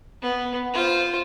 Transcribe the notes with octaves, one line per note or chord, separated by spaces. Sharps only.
B3
F4 C5